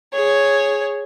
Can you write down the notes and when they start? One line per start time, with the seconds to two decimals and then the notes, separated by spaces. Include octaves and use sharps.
0.13 G#4 C#5